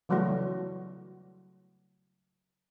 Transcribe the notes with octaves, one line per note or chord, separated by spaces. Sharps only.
C#3 E3 F#3 G3 A3 F#4